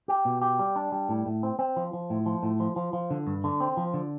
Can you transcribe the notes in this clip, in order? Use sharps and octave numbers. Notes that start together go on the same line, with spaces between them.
G4
B2
G4
G3
D4
G3
A2
A2
C4
C4
F3
F3
A2
F3
A2
F3
F3
F3
D3
G2
D3
C4
F3
D3